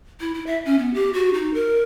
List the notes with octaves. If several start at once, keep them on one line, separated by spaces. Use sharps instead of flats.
E4
E4
E5
C#4
B3
G4
F#4
D#4
A#4